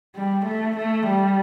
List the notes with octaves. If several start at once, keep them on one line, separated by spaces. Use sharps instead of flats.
G3
A3
A3
G3